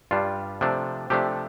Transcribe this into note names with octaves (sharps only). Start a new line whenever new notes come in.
G2 G3 D4 F4
C3 F3 A3 D4
C3 F3 A3 D4 G4